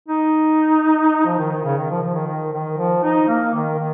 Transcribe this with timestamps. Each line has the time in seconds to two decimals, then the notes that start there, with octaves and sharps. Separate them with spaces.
0.08 D#4
1.26 F3
1.39 D#3
1.52 D#3
1.65 C#3
1.77 D#3
1.90 F3
2.02 F3
2.14 D#3
2.27 D#3
2.53 D#3
2.77 F3
3.03 D#4
3.28 A#3
3.54 D#3
3.78 D#3